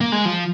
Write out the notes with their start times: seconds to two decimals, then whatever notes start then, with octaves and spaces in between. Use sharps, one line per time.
0.01 A#3
0.12 G#3
0.25 F3